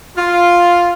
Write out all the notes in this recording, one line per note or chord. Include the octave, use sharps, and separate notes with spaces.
F4